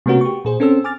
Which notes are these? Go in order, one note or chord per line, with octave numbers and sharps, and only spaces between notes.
C3 A3 B3 C#4 F#4 A#4
G4 C#6
A#2 G#4 C5
C4 C#4 A4 C5 E6
G#5 D6 F6 A6